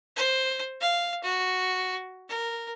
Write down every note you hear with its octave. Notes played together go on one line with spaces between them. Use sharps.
C5
F5
F#4
A#4